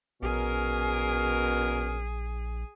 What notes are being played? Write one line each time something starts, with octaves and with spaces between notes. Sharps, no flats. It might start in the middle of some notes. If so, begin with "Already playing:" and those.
A#1 B2 C#4 G#4 A#4